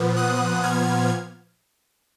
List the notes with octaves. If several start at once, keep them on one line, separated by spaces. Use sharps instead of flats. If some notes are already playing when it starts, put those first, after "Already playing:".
Already playing: A#2 F3 B3
D#6 F#6
F6 G#6